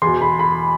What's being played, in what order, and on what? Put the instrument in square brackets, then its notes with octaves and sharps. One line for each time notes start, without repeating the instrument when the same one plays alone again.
[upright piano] E2 B2 C6
B5
B5